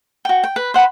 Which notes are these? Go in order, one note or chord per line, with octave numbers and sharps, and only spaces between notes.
F#4 G5
G5
B4
C5 F#5 G5 B5